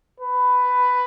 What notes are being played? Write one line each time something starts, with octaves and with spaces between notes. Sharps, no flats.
B4